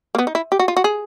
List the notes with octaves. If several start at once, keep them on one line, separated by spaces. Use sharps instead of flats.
A#3
B3
D#4
E4
G4
F#4
F4
F#4
G#4